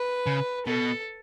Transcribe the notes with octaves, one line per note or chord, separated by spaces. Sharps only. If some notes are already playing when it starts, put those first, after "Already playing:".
Already playing: B4
C#3
B2 A4